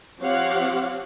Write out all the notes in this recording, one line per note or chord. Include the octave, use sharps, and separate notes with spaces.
F3 C4 G4 C#5 F5 F#5